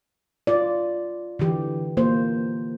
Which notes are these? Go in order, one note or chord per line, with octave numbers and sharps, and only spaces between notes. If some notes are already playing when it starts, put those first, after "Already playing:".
F4 D5
D3 E3 G4
A#3 F4 C5